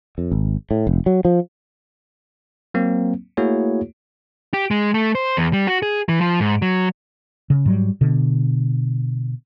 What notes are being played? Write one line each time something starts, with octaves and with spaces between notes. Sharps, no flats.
F2
G#1
A2
F1
F#3
F3
F#3 A#3 C4
A3 A#3 E4 F#4 G#4 C#5
G4
G#3
A3
C5
E2
G3
F#4
G#4
E3
F3
G#2
F#3
C#3
G#2 F#3 G3
B2 D3